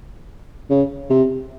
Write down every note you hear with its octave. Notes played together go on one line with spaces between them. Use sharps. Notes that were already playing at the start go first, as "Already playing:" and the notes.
C#3
C3